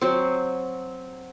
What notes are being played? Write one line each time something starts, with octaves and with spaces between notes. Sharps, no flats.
F#3 C4